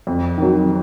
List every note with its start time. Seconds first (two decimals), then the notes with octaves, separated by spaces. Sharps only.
0.07 F2
0.38 D#3 F#3